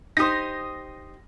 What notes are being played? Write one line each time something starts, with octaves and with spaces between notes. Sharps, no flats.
D#4 G4 C5 D#6 A#6